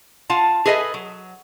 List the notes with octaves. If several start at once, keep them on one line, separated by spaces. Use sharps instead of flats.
F4 F5 F#5 A5
G#4 A4 B4 D#5 E5 G#5
F#3